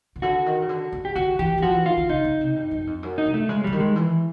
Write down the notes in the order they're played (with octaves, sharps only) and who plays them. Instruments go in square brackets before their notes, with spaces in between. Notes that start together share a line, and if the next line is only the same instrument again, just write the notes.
[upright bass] C#3
[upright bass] D3 [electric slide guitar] F#4
[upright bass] D#3
C#3
D3
D3
[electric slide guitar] G4
[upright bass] D3 [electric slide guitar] F#4
[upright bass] E3 [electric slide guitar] G4
[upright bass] E3
[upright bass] F3 [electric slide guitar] F#4
[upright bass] E3
[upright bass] D#3 [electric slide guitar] F4
[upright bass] D3
[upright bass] C#3 [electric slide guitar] D#4
[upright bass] C#3
C3
G2
F#2
F2
F#2
[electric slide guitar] D#4
[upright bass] C3
[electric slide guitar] A3
[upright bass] C#3 [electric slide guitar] G#3
[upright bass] D3 [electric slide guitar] G3
[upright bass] D#3
[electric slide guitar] G#3
[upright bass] E3